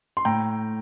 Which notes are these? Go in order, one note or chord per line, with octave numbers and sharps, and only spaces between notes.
C6
A2 G5 A#5